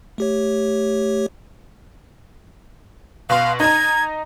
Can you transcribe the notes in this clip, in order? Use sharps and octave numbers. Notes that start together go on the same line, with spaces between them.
A3 G4 C#5
B2 F5 C6
D#4 A#5 G#6